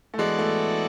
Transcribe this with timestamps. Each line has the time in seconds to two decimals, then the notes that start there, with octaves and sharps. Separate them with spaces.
0.14 A3
0.18 E3 G#3 B3 F#4 A4 D5
0.38 A3